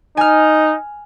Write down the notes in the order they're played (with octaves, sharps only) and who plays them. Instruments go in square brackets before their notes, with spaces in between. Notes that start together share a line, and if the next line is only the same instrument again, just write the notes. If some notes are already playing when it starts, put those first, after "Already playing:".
[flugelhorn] D#4 [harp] G#5 F6